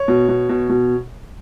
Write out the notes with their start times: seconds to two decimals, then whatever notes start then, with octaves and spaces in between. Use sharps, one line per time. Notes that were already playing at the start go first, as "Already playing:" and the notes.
Already playing: C#5
0.08 B2
0.28 B2
0.49 B2
0.69 B2